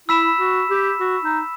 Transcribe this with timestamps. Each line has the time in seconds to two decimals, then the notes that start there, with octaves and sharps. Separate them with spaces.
0.08 E4 B5 E6 B6 E7
0.40 F#4
0.70 G4
1.00 F#4
1.23 D#4